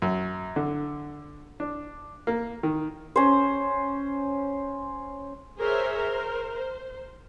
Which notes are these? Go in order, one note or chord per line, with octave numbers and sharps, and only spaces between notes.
F#2
D3
D4
A#3
D#3
C#4 C5
G#4 A#4 C5 C#5 E5
A#4 C5
C5